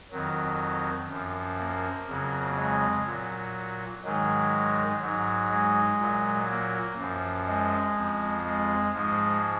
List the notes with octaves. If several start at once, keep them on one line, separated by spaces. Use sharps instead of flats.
F2 D#3 F#3
F#2 F3
A#3
F2 C#3 F#3
G#3
A#2 F#3
G#2 D#3 F#3 G#3
G#2 F#3
G#3
A#2 F#3
A#3
F#2 F3
G#3
F2 F3
G#3
G#2 F3 G#3